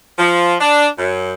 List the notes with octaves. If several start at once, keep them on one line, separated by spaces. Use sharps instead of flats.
F3
D4
F#2